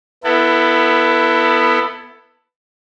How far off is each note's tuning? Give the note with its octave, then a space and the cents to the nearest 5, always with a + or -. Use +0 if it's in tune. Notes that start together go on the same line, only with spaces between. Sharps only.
B3 +0 E4 +10 A4 +25